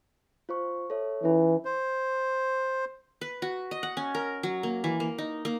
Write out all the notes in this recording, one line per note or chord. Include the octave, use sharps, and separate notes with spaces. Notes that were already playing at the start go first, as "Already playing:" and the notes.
F4 C5 C#6
A4 C#5 E5
E3 C#4 E4 F4
C5
B4
F#4
D#5
F#5
C#4
A#4
F#3
A#3
E3
A#3
D#4
A#3